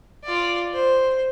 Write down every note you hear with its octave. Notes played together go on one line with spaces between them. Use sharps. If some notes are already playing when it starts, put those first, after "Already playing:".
F4 D5
C5